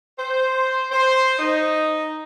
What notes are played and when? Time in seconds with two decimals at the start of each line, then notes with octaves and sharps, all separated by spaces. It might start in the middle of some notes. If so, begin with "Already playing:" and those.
0.19 C5
0.91 C5
1.39 D#4